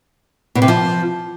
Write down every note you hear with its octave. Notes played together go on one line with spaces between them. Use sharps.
B2
C3
F3